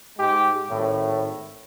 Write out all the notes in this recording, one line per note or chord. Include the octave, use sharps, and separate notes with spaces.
G#2 G#3 G4
G#1 A2